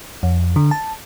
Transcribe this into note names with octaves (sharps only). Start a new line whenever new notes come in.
F2
D3
A5